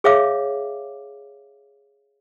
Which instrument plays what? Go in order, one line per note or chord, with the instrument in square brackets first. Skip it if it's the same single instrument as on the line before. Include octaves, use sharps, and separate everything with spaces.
[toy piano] G#4 C#5 E5 F5 D6